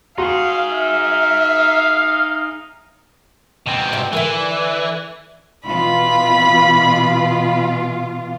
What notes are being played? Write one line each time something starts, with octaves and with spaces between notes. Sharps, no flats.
D#4 F#4 G#4 F5 F#5 C6
E5 F5
B2 C4
G#2 C3 E5
D3 E3 A#4 E5
B2 E3 F4 B5